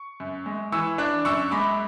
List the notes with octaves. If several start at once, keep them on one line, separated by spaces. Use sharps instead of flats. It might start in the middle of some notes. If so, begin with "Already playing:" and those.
Already playing: C#6
F#2
G#3
E3 C#6 E6
D4 D6 F#6
F#2 C#6 E6
G#3 B5 D6